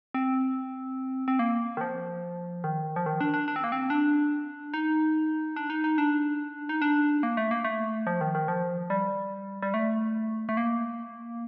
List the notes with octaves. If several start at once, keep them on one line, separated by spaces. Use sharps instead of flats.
C4
C4
A#3
D#3
F3
D#3
F3
D#3
D4
D4
D4
C4
A#3
C4
D4
D#4
D4
D#4
D#4
D4
D#4
D4
A#3
A3
A#3
A3
F3
D#3
D#3
F3
G3
G3
A3
A3
A#3